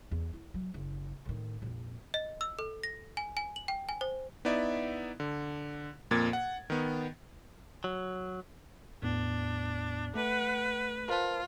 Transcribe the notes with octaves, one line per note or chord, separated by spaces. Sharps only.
E2
E4
F#3
F#1
A2 D#3
A#1 F2
D#5
E6
A4
A#6
G#5
G#5
F#7
G5
G#5
C5
B3 D#4 E4 D5 E5
D3
F2 A#2 A#3 G#6 A6
F#5
D#3 B3
F#3
E2 A2 B3 D4
A3 B4 F#5
F4 A#4 C5 A5